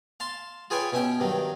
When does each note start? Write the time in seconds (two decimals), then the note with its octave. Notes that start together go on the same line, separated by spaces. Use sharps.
0.20 F5 A5 C6
0.70 F4 G#4 B4 C#5 G5 G#5
0.93 B2 C#4 E5 G5
1.20 G2 D#3 F#3